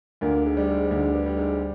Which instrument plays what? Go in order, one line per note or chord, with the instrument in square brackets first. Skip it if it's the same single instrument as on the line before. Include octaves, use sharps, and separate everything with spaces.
[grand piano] D2 [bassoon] A#2
[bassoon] G#2
[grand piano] G3
[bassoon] G#2
[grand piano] D2 [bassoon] G#2
[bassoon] G2
[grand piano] G3
[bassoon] G#2